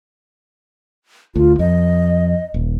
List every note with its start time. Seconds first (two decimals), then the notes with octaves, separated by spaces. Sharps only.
1.36 D2 F4
1.59 F2 D#5
2.54 D#1